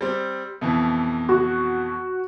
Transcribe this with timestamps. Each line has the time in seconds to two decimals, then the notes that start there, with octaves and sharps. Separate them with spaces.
0.01 G3 C4
0.61 F2 B2 E3
1.29 F#4